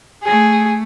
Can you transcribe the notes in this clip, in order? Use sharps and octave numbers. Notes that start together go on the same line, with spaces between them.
A3 G#4